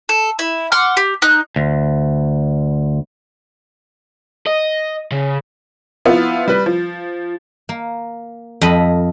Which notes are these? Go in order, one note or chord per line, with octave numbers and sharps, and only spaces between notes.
A4
E4
F#5 C6 D6 F6
G4
D#4 F#6
D2
D#5
C#3
F3 B3 E4 F4
G3 B4
F3
A#3
F2 A4 D#5 B5